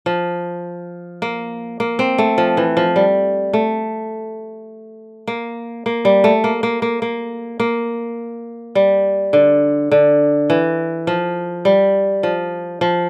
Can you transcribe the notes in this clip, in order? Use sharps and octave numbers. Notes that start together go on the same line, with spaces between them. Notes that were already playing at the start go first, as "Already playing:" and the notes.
F3
A#3
A#3
C4
A3
F3
E3
F3
G3
A3
A#3
A#3
G3
A3
A#3
A#3
A#3
A#3
A#3
G3
D3
D3
E3
F3
G3
F3
F3